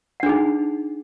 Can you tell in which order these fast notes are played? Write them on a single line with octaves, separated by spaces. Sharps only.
F#5 D4 G#4 D#4